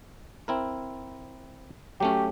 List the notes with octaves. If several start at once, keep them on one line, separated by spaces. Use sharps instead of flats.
C4 E4 A#4
F#3 A3 C#4 G4